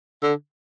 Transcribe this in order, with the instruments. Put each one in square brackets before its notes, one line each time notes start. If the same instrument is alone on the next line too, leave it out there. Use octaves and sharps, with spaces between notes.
[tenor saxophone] D3